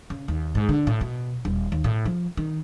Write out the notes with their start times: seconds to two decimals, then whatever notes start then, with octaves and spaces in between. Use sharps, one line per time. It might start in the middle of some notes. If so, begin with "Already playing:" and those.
0.10 C#3
0.28 D#2
0.55 G#2
0.69 D3
0.87 A2
1.01 B2
1.45 D#1
1.72 D#2
1.84 A2
2.05 F3
2.37 D#3